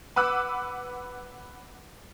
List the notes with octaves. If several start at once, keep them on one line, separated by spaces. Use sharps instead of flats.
B4 F#5 D6 E6 F#6